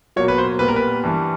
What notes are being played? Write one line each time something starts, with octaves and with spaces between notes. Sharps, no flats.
B2 F#3 A#3 C#5
B4
C5
A#2 G3 B3 B4
A#4
B4
G2 E3 G3